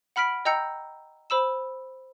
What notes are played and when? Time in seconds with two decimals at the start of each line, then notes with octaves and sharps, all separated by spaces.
0.16 F#5 B5 F6 B6 D7 F#7
0.45 D#5 G5 A#5 E6 G6 C#7
1.30 C5 B5 E6 E7